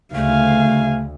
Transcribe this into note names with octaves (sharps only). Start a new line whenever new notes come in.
D2 C#3 A3 F5 G#5